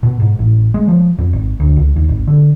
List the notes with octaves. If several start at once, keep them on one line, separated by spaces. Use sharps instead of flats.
B2
G#2
A1
G#3
F3
F2
G#1
D2
C#2
D#2
G#1
D3